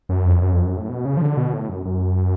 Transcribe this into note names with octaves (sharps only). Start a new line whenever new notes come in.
F#2
F2
F#2
F2
F#2
A2
B2
C#3
F3
D3
B2
A2
F#2
F#2